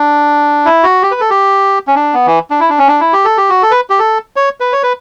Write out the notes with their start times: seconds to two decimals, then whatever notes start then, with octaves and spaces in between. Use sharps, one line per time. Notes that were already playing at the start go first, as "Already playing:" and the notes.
Already playing: D4
0.65 E4
0.83 F#4
1.03 G4
1.11 B4
1.20 A4
1.30 G4
1.87 C#4
1.95 D4
2.14 B3
2.26 E3
2.50 D4
2.60 E4
2.69 D4
2.78 C#4
2.88 D4
3.01 E4
3.13 G4
3.25 A4
3.37 G4
3.50 F#4
3.62 A4
3.71 B4
3.90 G4
3.99 A4
4.36 C#5
4.60 B4
4.73 C#5
4.83 B4